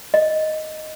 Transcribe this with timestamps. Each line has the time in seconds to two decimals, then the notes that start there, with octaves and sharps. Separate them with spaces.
0.14 D#5